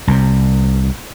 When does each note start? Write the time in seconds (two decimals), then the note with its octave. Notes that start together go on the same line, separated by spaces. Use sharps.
0.07 C2 C3